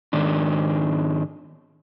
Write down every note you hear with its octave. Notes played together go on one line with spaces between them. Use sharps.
G#2 D#3 D4